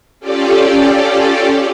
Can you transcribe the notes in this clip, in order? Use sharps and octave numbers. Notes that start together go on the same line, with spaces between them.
C#4 F4 G4 A4 D5